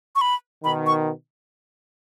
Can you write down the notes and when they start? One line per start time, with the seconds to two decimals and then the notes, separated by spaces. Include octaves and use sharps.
0.15 C#6
0.21 B5
0.64 B2 D#3 B5
0.86 C#6